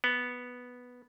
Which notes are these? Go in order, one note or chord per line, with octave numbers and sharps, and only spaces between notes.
B3